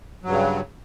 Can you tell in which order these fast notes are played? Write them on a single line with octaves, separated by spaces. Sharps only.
F#3 G2 C#3